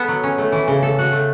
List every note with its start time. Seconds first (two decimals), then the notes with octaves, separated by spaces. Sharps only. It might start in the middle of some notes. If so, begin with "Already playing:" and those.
Already playing: B3 A4
0.08 F#3
0.24 C#4
0.38 A3
0.52 E3
0.68 C#3
0.83 A4
0.98 F#4
1.12 A3